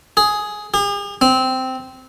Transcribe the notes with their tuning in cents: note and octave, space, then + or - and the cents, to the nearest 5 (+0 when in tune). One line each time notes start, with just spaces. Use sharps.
G#4 +10
G#4 -45
C4 -10